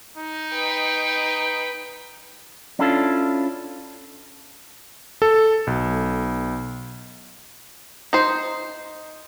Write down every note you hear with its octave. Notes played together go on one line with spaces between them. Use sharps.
D#4
B4 G5
C#4 D4 E4 F4 A4
A4
B1
D#4 C5